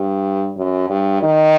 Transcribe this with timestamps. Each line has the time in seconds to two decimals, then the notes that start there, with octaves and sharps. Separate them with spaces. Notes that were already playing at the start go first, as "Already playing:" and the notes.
Already playing: G2
0.58 F#2
0.89 G2
1.23 D#3